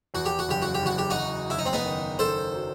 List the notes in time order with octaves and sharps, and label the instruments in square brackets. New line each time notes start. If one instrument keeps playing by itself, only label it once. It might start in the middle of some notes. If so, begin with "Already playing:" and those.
[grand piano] E2 [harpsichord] F#4
[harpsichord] G4
F#4
[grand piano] F#1 [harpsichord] G4
[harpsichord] F#4
G4
[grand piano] F#1 [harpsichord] F#4
[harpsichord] G4
D#4 F#4
[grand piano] F#1
[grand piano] F#1 [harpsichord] E4
[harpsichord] D#4
C4
B3 D#4
[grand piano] D#3
[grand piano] D#3 [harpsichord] A4 C5
[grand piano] F#3